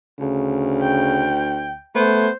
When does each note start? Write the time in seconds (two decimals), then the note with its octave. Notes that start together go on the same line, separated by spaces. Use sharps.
0.20 D2 C#3
0.81 G5
1.95 A3 B3 C5